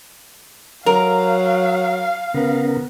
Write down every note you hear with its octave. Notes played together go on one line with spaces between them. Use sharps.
F#3 A#4 F5
C#3 B3 A#4